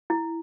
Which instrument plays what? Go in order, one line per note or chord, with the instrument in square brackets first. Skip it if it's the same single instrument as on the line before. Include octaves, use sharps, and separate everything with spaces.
[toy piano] E4